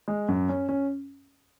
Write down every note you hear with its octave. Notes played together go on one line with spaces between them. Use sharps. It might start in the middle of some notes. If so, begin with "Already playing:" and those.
G#3
F#2
C#4
C#4